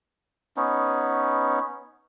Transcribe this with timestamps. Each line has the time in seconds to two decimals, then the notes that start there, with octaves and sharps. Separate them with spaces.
0.57 B3 C#4 D#4